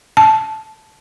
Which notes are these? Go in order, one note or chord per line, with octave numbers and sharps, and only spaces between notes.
A5